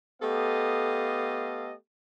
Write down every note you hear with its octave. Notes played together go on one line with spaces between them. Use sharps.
A3 B3 G4 A4 D#5 F5